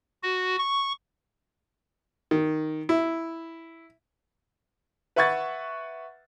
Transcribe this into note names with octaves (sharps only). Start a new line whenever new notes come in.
F#4
C#6
D#3
E4
B4 E5 F#5 C#6 G#6 A6